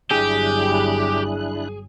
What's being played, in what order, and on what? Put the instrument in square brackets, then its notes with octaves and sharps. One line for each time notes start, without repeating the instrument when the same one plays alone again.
[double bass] G1 F#3 [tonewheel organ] D4 E4 F#6 [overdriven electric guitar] G4 [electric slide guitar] G#4